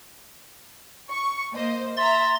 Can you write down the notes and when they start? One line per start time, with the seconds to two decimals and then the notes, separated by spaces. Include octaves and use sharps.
1.09 C#6
1.55 A#3 C5 D#5
1.97 E5 A#5 C6 A6